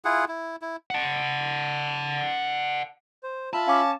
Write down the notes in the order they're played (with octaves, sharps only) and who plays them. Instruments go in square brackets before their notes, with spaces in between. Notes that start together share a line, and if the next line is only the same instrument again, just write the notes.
[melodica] E4 F4 G#4 F#5
E4
E4
[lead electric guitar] F#5 A5
[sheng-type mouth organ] C5
[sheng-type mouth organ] F4 E5 B5 [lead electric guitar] A5
[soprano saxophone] C#4 [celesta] F5 D6